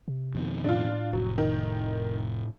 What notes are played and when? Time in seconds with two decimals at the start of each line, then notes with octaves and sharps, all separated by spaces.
0.08 C3
0.35 F2 B2 D#3
0.64 A2 D4 F4
1.13 F1 F#3
1.38 D#3